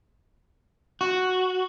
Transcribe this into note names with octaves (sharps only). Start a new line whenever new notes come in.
F#4